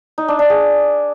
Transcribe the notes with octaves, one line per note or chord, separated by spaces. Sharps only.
D#4
D4
D4
G#4